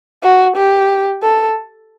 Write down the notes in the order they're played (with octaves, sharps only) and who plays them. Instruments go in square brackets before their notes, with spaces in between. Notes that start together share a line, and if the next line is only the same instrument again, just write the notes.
[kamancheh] F#4
G4
A4